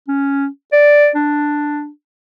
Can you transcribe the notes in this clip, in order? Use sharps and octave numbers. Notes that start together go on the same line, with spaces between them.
C#4
D5
D4